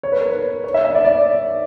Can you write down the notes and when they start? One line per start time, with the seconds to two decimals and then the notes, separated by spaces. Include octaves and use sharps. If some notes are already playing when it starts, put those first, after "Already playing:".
0.03 C#5
0.12 B4
0.21 A#4
0.30 B4
0.64 C#5
0.74 E5
0.85 E5
0.95 D5
1.05 D5